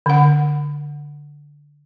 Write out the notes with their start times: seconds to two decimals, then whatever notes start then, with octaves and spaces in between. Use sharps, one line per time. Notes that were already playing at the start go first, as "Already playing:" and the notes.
0.06 D3 F#5